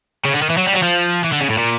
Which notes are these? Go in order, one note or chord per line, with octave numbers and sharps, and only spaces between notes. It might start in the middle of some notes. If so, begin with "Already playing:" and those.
C#3
D3
D#3
E3
F#3
G3
F#3
F3
E3
D3
C#3
A2
A#2